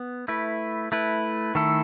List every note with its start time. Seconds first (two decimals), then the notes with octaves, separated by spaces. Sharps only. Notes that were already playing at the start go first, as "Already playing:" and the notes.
Already playing: B3
0.28 A3 E4 B4
0.92 A3 E4 B4
1.55 D#3 A3 E4 A4